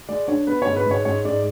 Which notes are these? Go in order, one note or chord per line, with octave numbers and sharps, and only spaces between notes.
G#3 D5
D4 C#5
B3 B4
G#2 C#5
B4
G#2 C#5
G#2 C#5
G#2 D5